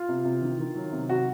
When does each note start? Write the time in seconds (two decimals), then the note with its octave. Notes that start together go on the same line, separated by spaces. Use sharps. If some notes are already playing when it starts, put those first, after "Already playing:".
Already playing: F4
0.09 C3
0.25 C3
0.41 D#3
0.59 D#3
0.75 F#3
0.92 C3
1.09 C3 F#4